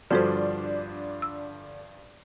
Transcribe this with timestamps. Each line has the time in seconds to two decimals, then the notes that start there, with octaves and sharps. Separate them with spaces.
0.11 G2 D3 F3 D4 F#4 A4 C5
1.22 E6